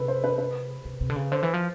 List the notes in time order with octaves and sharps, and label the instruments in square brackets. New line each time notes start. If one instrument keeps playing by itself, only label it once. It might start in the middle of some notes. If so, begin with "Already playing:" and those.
Already playing: [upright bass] C3 [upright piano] A4 B4
[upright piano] C5
B4
B4
[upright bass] C3
C3
D3
C#3
[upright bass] D3 [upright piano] C5
[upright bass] E3
F3